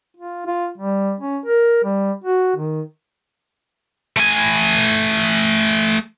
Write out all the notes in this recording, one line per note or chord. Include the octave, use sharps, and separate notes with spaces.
F4
F4
G3
C#4
A#4
G3
F#4
D#3
A3 G#5